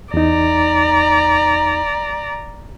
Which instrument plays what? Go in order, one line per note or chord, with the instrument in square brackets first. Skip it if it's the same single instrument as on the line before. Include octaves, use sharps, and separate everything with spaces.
[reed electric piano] E2 D#4 [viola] D5 A#5